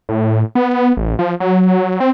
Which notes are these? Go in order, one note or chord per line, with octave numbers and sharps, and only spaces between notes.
A2
B3
A1
F3
F#3
C4